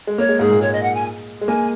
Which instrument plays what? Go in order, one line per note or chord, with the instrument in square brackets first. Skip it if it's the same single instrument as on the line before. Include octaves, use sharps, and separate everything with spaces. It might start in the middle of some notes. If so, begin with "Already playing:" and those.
[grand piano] G#3
[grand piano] A#3 [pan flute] C#5
[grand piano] G#3
[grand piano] G#2 [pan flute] G#4
[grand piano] A#2
[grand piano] G#3 [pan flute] C#5
[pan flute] D#5
F#5
G#5
[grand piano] G#3
[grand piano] A#3 [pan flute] G#5